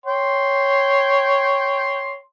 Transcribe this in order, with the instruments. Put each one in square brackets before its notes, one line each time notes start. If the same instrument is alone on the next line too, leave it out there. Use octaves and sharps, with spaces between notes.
[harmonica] C#5 G5 C6